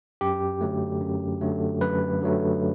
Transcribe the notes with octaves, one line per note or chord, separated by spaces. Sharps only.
F#2 G4
D3 F#3 A3
F#2
D3 F#3 A3
F#2 B4
D3 F#3 A3